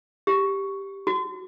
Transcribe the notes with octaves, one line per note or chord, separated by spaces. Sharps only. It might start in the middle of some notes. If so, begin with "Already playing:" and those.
G4
F#4